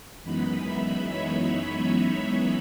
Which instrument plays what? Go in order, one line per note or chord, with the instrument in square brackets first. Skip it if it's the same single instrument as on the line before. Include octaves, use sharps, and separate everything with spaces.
[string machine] F#2 E3 G#3 B3 D#4 B5
E5
C#5
C#5